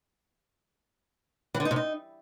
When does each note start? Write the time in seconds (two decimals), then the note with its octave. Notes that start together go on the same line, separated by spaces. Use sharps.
1.54 E3
1.60 D3
1.65 D#4
1.71 C3
1.76 D#4